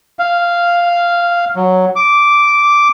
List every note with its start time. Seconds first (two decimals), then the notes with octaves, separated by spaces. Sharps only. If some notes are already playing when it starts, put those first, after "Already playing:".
0.19 F5
1.56 F#3
1.96 D6